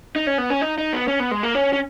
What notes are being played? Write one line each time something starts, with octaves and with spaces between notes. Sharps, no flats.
D#4
C#4
B3
C#4
D#4
D#4
B3
C#4
B3
G#3
A#3
C#4
C#4